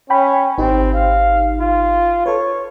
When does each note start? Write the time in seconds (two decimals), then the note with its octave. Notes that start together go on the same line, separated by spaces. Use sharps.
0.10 C#4 G5 B5
0.58 G#1 C4 D#4 G4
0.94 F5
1.60 F4
2.26 A4 B4 C#5